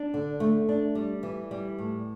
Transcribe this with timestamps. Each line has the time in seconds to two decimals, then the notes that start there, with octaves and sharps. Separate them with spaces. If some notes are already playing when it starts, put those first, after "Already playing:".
Already playing: D4
0.14 D3
0.40 A3
0.69 D4
0.95 G3
1.23 E3
1.51 G3
1.78 A2